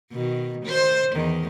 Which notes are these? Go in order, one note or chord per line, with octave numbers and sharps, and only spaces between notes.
B2 D#3
D#3 C5
E2 D#3